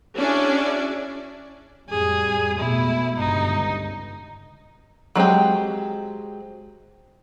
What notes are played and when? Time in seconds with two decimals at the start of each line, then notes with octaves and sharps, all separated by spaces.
0.16 C#4 D4 E4 F#4 G#4 D5
1.90 F2 A2 G3 G#4
2.59 B2 G#3 A3 E4
3.18 G1 C#2 G2 D#4
5.15 F#3 G#3 C4 G4